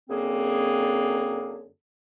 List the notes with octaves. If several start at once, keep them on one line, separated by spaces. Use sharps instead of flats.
F#2 D3 A#3 C4 G#4